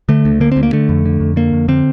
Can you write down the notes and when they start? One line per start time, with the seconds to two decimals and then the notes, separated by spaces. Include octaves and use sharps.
0.09 D3 A3
0.25 D2
0.40 D3 A#3
0.52 C4
0.56 D2
0.63 A#3
0.73 D3 A3
0.89 F2
1.05 D3
1.20 F2
1.36 D3 A#3
1.53 F2
1.68 D3 C4